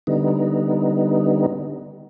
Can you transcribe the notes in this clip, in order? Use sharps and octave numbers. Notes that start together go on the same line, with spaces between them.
D3 G3 B3 D#4